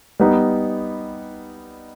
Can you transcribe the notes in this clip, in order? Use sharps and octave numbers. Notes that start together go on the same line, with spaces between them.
G3 B3 D#4